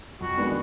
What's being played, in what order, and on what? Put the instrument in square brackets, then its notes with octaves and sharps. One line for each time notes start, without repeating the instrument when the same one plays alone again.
[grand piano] F2 [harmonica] F#4
[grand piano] D#3 G#3 B3 D4